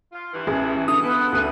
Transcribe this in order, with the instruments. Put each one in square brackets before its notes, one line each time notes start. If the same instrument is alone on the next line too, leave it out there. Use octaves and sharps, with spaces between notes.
[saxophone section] F4
G2 E3
[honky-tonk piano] A1 G#4
[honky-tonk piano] D3 [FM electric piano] D#6
[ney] B3 [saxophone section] E4 F4 A4
[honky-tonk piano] D2 A4 D#7 [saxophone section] G3